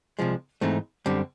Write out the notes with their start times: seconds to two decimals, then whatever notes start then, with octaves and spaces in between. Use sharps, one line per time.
0.19 C2 C3 F3 G#3
0.61 G#2 E3 A3 C4 D#4
1.06 F#2 D3 G3 C4